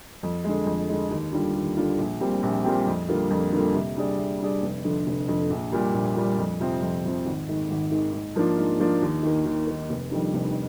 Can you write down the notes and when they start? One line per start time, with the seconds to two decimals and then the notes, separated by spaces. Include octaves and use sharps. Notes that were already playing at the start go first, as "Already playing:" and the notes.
0.23 F2
0.44 D3 G#3
0.66 F2
0.89 D3 G#3
1.11 D#2
1.33 D3 G3 D4 F4
1.55 D#2
1.77 D3 G3 D4 F4
1.98 A#1
2.21 A#2 G3 C4 G4
2.43 A#1
2.65 A#2 G3 C4 G4
2.87 F2
3.08 D3 G3 A#3 F4
3.30 F2
3.53 D3 G3 A#3 F4
3.74 C3
3.96 G3 D4 G#4 D5
4.18 C3
4.40 G3 D4 G#4 D5
4.62 F1
4.84 F2 D3
5.07 F1
5.28 F2 D3
5.50 A#1
5.72 A#2 G3
5.94 A#1
6.16 A#2 G3
6.38 F2
6.60 C3 F3 C4
6.82 F2
7.04 C3 F3 C4
7.26 G#1
7.48 G#2 D#3
7.70 G#1
7.91 G#2 D#3
8.13 G#2
8.36 F3 A#3 D4 F4
8.58 G#2
8.80 F3 A#3 D4 F4
9.02 D#2
9.23 D#3 A#3
9.46 D#2
9.67 D#3 A#3
9.90 F1
10.11 F2 D#3 G3 D4
10.33 F1